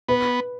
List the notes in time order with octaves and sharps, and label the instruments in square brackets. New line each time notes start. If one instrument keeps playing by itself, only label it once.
[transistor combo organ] B3 [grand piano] B4